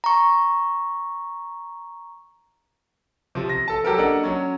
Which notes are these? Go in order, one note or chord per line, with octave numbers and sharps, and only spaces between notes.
A#5 C#6
C3 F3
A#6
A4 A5
F#3 G4 A4 A#4
A#3 D4 A4 D#5 F#5 A#5
F#3 C#4